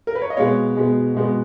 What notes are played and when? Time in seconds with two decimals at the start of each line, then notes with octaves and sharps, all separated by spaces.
0.07 A#4
0.15 B4
0.22 C#5
0.30 D#5
0.37 B2 G#3 B3 C#5 F5
0.75 B2 G#3 B3
1.15 B2 G#3 B3